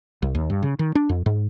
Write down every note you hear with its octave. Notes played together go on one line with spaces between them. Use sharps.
C2
D#2
G2
C#3
D#3
D4
F2
G#2